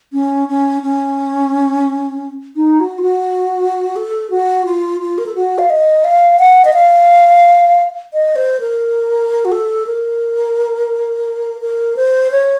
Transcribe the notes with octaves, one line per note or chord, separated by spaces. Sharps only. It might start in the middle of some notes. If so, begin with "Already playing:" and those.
C#4
C#4
C#4
D#4
F#4
F4
F#4
A4
F#4
F4
F4
A#4
A4
F#4
F5
D#5
F5
F#5
D#5
F5
D#5
C5
A#4
F#4
A4
A#4
A#4
C5
C#5